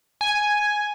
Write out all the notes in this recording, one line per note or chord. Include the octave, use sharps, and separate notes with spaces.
G#5